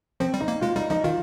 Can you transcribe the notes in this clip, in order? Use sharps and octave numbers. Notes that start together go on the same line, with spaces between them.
F3 C4
G3
D#4
A#3
G#3 F4
G3 D#4
F3 D#4
D#3 F4